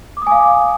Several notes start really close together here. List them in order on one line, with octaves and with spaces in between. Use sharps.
D6 D#6 G#5 F5